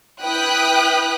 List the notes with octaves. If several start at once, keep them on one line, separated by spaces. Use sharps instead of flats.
E4 B4 G5 D#6 F#6 B6